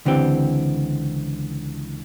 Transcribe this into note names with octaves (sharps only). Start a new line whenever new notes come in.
C#2 D3 E3 C4 G4